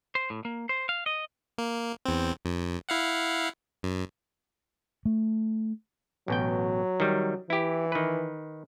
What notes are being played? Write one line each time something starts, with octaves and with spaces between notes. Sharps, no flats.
C5
A2
A#3
C5
F5
D#5
A#3
E2 C4
F2
E4 F5 F#5
F#2
A3
A1 B2 F#3 G5
D#3 G3
E3 E4 G4
D#3 B4